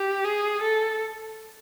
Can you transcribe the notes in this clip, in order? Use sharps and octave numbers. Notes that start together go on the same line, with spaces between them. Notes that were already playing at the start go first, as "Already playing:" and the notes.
Already playing: G4
G#4
A4